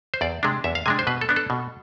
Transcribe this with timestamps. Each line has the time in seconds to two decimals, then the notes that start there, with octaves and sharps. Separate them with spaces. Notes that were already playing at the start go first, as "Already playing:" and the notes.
0.14 C5
0.21 E2 D5
0.43 C3 G#3 D4
0.64 E2 E5
0.75 F5
0.86 C3 G#3 D4 G#5
0.99 C5
1.07 B2 B4
1.21 A4
1.29 B3 D4
1.36 A4
1.50 B2